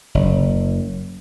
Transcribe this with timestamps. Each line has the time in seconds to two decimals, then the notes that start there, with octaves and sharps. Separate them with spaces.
0.15 F#1